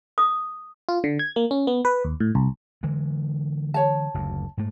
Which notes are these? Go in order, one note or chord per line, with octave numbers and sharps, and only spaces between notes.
D#6
F4
D3
G#6
A#3
C#4
B3
B4
D#2
A2
C2
D3 E3 G#3
C#5 A5
F#1 D2
G#2 A3